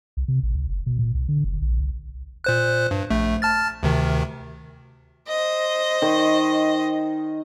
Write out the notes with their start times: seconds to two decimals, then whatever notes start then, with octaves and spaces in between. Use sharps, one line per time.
0.17 C2
0.28 C3
0.43 A1
0.55 C#2
0.69 F#1
0.86 B2
0.99 A#2
1.14 C2
1.29 D3
1.44 F#1
1.62 A#1
1.80 C2
2.44 A#2 C5 F#6
2.91 G2
3.10 A#1 A3
3.42 A5 F6 A6
3.83 D2 C3 D#3
5.28 C5 D#5
6.02 D#3